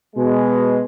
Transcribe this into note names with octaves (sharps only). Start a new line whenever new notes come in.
B2 G#3